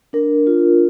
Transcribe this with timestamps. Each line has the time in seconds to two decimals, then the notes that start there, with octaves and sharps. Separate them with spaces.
0.13 D4 A#4
0.47 F4